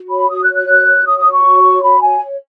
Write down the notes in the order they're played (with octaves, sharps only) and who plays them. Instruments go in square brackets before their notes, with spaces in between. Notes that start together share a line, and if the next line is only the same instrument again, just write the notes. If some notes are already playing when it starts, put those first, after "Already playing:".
Already playing: [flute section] F#4
C#5 B5
F#4 D#6
F#6
C#5
F#6
F#4
C#5
F#4 D#6
D#6
C#5
C#6
F#4
C#5
F#4 B5
C#5 G#5